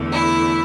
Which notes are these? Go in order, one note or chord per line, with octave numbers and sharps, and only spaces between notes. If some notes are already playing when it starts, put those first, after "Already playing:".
Already playing: E2 D3 A3
E4